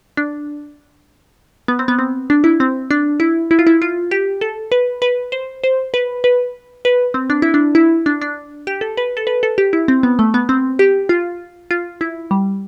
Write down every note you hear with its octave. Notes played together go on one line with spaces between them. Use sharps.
D4
B3
C4
B3
C4
D4
E4
C4
D4
E4
E4
F4
E4
F4
G4
A4
B4
B4
C5
C5
B4
B4
B4
C4
D4
E4
D4
E4
D4
D4
G4
A4
B4
A4
B4
A4
G4
E4
C4
B3
A3
B3
C4
G4
F4
F4
E4
G3